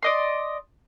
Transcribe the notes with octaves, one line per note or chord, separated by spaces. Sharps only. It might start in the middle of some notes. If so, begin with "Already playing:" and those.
D5 D#5 C6